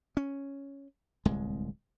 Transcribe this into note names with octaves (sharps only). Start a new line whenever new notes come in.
C#4
D1 C2 G#3